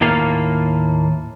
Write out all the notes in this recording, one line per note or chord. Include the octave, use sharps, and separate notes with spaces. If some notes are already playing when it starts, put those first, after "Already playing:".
D#2 A2 A#3 F4 F5